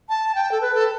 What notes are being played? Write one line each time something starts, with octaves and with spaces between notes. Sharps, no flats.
A5
G5
A4
B4
A4